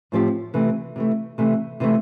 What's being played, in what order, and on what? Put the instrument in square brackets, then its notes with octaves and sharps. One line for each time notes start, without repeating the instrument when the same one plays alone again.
[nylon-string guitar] A2 F3 C4 G4
C3 E3 A3
C3 E3 A3
C3 E3 A3
C3 E3 A3